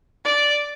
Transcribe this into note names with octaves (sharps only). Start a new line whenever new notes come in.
D5